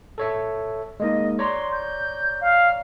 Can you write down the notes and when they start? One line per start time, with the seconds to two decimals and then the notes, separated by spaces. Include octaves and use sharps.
0.18 A4 C#5 E5
1.00 G#3 A#3 D#4 D#5
1.39 C#5 D5 A#5 C6
1.72 G6
2.41 F5